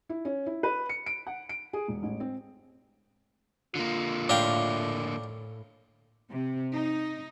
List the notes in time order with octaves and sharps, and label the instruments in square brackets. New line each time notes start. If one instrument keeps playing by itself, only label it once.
[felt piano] E4
C#4
E4
B4
C#7
D7
F#5
D7
G#4
E1
A1
C4
[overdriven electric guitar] D3 A#3 [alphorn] F4
[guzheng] A2 [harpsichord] D4 F5 G5
[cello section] C3
D#4